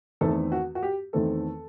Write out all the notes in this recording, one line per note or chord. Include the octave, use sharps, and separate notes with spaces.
E2 D#3 A3 C4 A4
F#4
F#4
G4
E2 D#3 A3 C4 A4